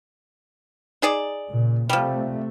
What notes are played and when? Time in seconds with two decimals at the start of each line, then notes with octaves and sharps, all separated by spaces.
1.02 D#4 G#4 D5
1.48 A#2 C#3
1.89 C3 F3 G3 A3